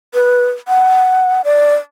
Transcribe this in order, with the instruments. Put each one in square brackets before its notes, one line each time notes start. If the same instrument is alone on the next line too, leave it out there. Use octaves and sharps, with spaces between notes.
[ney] B4
F#5
D5